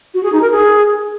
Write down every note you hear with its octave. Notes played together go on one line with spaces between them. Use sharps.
F#4
G#4
D#4
A#4
G#4